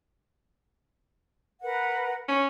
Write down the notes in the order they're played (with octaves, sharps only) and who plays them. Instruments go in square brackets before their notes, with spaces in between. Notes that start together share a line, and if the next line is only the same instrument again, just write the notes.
[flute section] A#4 B4 F#5
[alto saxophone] C#4